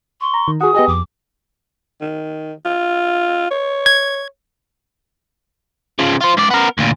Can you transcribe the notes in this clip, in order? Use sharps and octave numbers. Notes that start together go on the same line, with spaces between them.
C6 C#6
A#5
D#3
F#4 G#4 F#5 D#6
B3 G4 G#4 D#5
F2 D6
D#3
F4
C#5
G#6
C#3 F3
F4 C5
G#2 D5
B3 A#4
D2 A#2